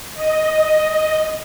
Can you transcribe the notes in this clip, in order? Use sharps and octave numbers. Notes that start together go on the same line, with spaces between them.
D#5